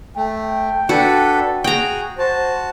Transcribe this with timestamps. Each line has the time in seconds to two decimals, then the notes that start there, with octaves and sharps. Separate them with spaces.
0.17 A3 G5
0.89 D4 F#4 A4 B4
1.64 F#4 G#4 G5 A#5
2.18 F#4 C5 A5